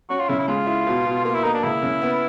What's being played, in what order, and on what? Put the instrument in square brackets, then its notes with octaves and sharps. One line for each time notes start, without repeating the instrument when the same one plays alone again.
[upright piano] C#4 [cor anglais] F#4
[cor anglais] F4
[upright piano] C#3 [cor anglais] E4
[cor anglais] E4
[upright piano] G#3 [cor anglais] F4
[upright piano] E4
B2
B2
[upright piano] A#3 [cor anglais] F4
[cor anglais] E4
[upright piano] A#3 [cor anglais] D#4
[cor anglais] D4
[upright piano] C#2 [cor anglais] E4
[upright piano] C#3
B3